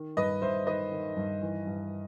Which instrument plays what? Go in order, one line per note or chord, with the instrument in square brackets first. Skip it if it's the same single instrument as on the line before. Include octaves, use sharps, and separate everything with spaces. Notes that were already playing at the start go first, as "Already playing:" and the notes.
Already playing: [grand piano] D#3
G2 B4 D#5
G2 C5 E5
D#3 B4 D#5
D#3
G2
E3
G2